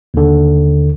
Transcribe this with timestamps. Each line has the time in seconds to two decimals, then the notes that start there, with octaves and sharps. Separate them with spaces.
0.14 D#2 D3